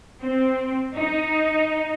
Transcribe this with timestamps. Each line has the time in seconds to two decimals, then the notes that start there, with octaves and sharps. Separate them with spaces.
0.21 C4
0.96 D#4